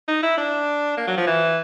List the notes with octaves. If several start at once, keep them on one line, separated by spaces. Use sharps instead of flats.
D#4
E4
D4
A#3
F#3
F3
E3